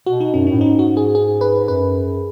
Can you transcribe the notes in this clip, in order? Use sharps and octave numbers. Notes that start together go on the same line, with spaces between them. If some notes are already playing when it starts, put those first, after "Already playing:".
B2 F#4
D#4
F#2 C#4
A2 C#4
G#2 D#4
F#4
G#4
G#4
B4
F#2 B4